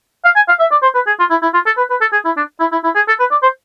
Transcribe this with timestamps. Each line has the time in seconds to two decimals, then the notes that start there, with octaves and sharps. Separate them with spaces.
0.25 F5
0.36 G#5
0.48 F5
0.60 E5
0.71 D5
0.82 C5
0.94 B4
1.07 G#4
1.19 F4
1.30 E4
1.42 E4
1.53 F4
1.66 A4
1.77 B4
1.90 B4
2.01 A4
2.12 G#4
2.25 E4
2.37 D4
2.60 E4
2.72 E4
2.84 E4
2.95 G#4
3.08 A4
3.19 B4
3.31 D5
3.42 C5